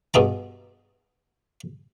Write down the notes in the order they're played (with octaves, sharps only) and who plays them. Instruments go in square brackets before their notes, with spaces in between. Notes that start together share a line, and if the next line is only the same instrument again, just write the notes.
[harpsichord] G2 B2 G#4 A#5